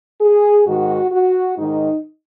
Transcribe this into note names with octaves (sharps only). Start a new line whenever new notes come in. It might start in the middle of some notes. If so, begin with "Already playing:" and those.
G#4
G#2 D#3 F#4
F#4
G#2 D#3 D#4